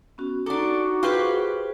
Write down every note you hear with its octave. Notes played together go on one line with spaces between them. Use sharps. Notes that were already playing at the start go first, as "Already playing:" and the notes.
B3 C#4 F#4
D4 D#4 F#4 A4 A#5 D6
F4 G4 G#4 B4 C5